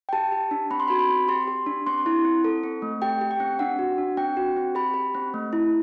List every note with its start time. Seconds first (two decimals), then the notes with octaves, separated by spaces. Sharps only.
0.09 G5
0.13 G4 A5
0.32 G4
0.51 D4
0.71 C4 B5
0.80 C6
0.88 F#4 B5
0.99 B5
1.10 C4
1.28 G4 C6
1.47 G4
1.66 D4
1.87 C4 C6
2.06 E4
2.24 C4
2.44 A4
2.63 C4
2.82 A3
3.02 G4 G5
3.21 G4
3.31 G5
3.40 C4
3.59 D4 F#5
3.79 F#4
3.98 D4
4.17 C4 G5
4.37 F#4
4.56 C4
4.75 G4 B5
4.94 G4
5.15 C4
5.34 A3
5.53 E4